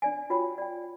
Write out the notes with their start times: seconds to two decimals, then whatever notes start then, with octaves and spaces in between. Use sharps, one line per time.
0.02 D4 D5 G#5
0.30 F4 F#4 C#5 G5 B5
0.58 D5 G5